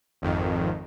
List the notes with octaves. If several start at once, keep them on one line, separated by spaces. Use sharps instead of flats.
G#1 F2 D#3